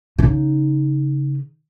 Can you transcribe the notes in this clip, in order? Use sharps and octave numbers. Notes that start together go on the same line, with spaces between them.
C#3 D#4